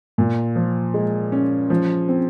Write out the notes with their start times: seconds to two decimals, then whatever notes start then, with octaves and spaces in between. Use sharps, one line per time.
0.18 A#2
0.56 F3
0.94 G#3
1.32 C#4
1.70 F3
2.08 C4